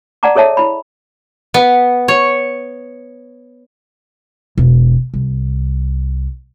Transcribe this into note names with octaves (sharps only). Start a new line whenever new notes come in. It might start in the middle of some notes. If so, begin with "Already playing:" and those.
D5 F#5 A5 A#5 D6
G#4 A4 C#5 E5 A5
E4 B5
B3
C#5
E1
C2